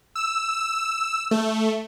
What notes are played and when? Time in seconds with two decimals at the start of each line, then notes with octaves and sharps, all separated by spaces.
0.16 E6
1.31 A3